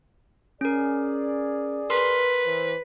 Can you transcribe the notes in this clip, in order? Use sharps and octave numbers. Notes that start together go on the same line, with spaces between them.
C#4 G#4 A#4 D5
A#4 B4 C6
E3 C5